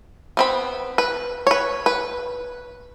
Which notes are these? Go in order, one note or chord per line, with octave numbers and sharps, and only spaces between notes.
B3 C4 B5
B4
B4 C#5
B4